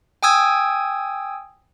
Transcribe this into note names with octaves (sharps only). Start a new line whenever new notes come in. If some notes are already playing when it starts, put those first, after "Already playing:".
G5 G#5 D#6 E6 G#6